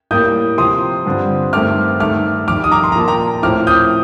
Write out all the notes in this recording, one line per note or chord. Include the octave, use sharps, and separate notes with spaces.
A2 G3 A#3 D#6 G6
C3 F3 C4 C6 D#6
G2 D3 G3 C4
G2 D#3 A3 C4 D6 F6
G2 D#3 A3 D6 F6
F2 D#3 G3 D6 F6
D#6
A#5 D6
C6
A#5
A#2 F3 A#3 A5
G5 A#5
A2 F3 A3 C4 D6 F6
D#6 G6